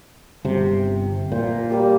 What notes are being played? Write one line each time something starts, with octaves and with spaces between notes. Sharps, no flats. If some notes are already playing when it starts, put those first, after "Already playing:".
G1 C3
A#2 F4 C5
G3 A#3 G4